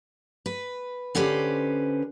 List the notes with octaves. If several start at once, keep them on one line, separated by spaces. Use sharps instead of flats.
B4
D3 C#4 G4 B4 C5